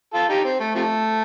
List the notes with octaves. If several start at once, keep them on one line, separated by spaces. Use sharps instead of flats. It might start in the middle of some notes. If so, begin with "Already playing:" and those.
F4 A4
D#4 G4
C4
A3
C3 F3 A3